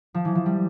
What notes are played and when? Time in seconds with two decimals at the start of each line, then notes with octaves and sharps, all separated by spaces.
0.14 F3
0.25 E3
0.35 F3
0.46 G3